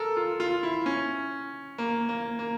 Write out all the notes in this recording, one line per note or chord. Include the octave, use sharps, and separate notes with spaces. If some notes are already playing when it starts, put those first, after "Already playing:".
Already playing: A4 A#4
F4
F4
E4
C#4
A#3
A#3
A#3